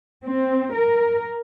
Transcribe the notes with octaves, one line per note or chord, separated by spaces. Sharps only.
C4
A#4